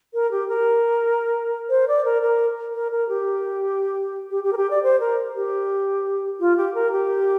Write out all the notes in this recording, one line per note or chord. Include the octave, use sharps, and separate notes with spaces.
A#4
G4
A#4
C5
D5
A#4
A#4
A#4
A#4
G4
G4
G4
A#4
G4
D5
C5
A#4
G4
F4
G4
A#4
G4